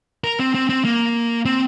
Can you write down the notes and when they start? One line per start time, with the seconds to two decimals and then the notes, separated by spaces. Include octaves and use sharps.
0.24 A#4
0.39 C4
0.55 C4
0.69 C4
0.85 A#3
1.45 C4